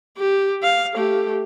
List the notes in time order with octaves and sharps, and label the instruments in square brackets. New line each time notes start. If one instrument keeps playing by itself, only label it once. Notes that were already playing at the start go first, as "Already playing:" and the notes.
[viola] G4
F5
A3 G4